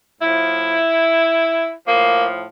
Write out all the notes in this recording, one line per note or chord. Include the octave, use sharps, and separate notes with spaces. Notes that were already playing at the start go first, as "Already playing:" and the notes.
A2 F3 E4
A2 F3 A#3